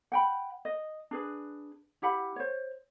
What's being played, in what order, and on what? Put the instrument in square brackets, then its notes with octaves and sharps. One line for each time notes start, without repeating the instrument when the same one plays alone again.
[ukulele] F#5 G5 B5
D#5
D4 G#4 B4
E4 G4 F#5 B5
C5 C#5